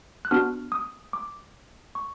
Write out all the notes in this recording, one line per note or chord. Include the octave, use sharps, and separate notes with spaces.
F#6
B3 D4 F#4 F6
D#6
D6
C#6